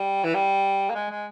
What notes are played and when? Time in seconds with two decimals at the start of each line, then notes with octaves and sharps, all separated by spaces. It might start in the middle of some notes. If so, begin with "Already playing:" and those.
Already playing: G3
0.24 E3
0.34 G3
0.90 A#3
0.95 G#3
1.11 G#3